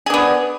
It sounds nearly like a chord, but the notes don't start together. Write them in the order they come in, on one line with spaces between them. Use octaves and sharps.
G#4 D4 B3